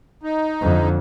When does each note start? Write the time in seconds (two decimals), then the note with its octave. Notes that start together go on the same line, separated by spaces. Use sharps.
0.23 D#4
0.62 F2 D3